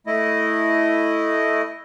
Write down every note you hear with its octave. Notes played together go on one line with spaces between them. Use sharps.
A3 E4 D#5